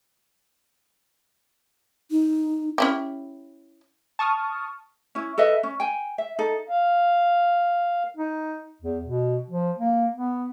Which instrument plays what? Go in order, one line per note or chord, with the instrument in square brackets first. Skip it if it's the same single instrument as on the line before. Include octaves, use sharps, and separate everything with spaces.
[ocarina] D#4
[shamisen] C#4 E4 G4
[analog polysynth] A5 C#6 D#6 F6
[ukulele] C#4 E4
A4 B4 D#5 E5
C#4
G5 G#5
E5
D#4 A4
[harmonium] F5
[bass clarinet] D#4
E2
B2
F3
A#3
B3